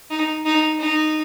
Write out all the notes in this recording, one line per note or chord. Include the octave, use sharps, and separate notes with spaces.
D#4
D#4
D#4